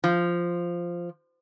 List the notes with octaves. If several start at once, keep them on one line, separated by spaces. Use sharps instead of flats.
F3